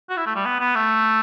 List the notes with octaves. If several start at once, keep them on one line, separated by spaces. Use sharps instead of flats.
F#4
E4
A3
G3
B3
B3
A3